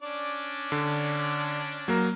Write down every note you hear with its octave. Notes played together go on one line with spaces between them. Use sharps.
C#4 D4 D5
D3
F#3 A#3 A#4